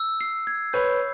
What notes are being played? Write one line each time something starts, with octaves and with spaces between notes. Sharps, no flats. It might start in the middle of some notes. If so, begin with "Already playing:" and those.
Already playing: E6
C7
G#6
B4 C#5 G6